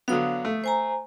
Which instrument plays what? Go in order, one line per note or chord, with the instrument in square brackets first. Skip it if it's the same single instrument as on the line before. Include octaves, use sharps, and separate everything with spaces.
[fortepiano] D3 F#3 B3 [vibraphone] F5 D#6
[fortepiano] A3
[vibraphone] C5 G#5 A#5